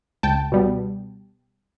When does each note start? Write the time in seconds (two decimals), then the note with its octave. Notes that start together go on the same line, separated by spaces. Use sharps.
0.23 C#2 G5 A5
0.52 B2 G3 B3